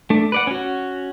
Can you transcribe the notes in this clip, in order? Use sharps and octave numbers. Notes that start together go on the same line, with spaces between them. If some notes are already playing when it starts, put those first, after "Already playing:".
A3 D4
B4 D5 F#5
C#4 F#4